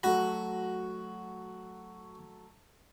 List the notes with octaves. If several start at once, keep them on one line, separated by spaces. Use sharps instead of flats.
F#3 A3 F#4 B5 A#6